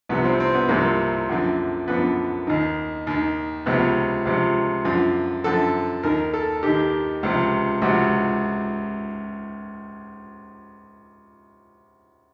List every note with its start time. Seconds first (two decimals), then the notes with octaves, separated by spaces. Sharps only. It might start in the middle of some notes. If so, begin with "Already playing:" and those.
0.09 C2 C3 F3 B3
0.25 C4
0.40 C4
0.55 B3
0.69 C2 C3 F3 A#3
1.29 F#2 D3 F3
1.88 F#2 D3 F3 B3
2.47 D#2 D#3
3.07 D#2 D#3
3.66 C#2 C3 F3 B3
4.25 C#2 C3 F3
4.85 F#2 D3 F3 F4
5.44 F#2 D3 F3 A4
6.03 D#2 D#3 A#4
6.34 A4
6.63 D#2 D#3 G4
7.23 C#2 C3 F3
7.82 C#2 C3 F3 F#4